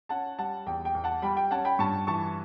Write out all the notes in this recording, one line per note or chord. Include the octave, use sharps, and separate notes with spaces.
C#4 F#5 A5
G3 F#5 A5
E2 G5
G5
E2
F#5 A5
G3 G5 B5
G5
C#4 F#5 A5
G5 B5
G2 A5 C#6
E3 A5 C#6